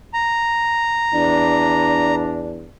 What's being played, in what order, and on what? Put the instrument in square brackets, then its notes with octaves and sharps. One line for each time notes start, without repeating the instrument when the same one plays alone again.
[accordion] A#5
[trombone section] E2 D4